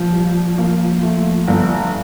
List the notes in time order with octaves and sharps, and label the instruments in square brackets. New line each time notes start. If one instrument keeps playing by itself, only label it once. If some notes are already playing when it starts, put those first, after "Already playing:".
Already playing: [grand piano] A#2 [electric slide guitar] F3
[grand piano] G3
A#3
A3
G1